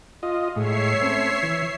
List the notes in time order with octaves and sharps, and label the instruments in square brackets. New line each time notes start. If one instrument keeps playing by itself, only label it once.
[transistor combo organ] F4 D#5
[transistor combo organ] A2 G#3 [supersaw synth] C#5 E5 C7
[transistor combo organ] A3 C4 C#4
E3